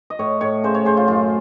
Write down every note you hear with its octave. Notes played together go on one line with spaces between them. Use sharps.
D#5
A2 C#5
A2 C#5
C#3 C5
C#5
C#3 C5
F4
F#2 F4